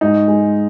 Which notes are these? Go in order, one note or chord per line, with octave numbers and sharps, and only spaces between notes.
G#2 D#4
G#3